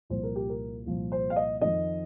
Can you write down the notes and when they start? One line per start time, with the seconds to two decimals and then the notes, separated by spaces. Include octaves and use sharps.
0.10 C2 A#2 F3 C5
0.23 A#4
0.36 G4
0.49 A#4
0.86 C2 A#2 F3
1.12 C5
1.30 F5
1.36 D#5
1.61 F2 D#3 D#5